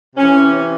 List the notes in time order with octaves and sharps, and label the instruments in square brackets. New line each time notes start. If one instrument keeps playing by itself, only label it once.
[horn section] C3 E3 C#4